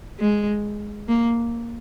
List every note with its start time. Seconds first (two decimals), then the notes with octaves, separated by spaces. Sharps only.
0.19 G#3
1.08 A#3